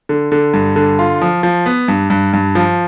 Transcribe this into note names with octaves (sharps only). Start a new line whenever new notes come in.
D3
D3
G2
D3
F4
F3
F3
B3
G2
G2
G2
F3